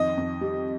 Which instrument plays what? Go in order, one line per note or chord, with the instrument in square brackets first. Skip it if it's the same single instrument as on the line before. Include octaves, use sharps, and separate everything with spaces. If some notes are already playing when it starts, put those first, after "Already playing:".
Already playing: [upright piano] F2 D#3 D#5
F2
G3